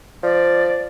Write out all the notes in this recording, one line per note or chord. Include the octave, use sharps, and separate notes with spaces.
F3 D5